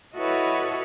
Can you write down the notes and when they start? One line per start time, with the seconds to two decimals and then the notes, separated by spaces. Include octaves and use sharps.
0.16 E4 F#4 A4 B4 C#5 D#5